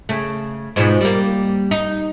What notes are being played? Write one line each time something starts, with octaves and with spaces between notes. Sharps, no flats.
C#3 A3
G#2 B2 F3
G3 A#3
D#4